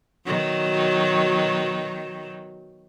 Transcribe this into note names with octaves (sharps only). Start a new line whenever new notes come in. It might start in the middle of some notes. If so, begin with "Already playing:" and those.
B2 D#3 F#3